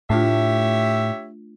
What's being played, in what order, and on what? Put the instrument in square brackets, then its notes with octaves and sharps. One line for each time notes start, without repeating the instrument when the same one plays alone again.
[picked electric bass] A2 [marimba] A3 D4 F4 [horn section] G4 C#5 E5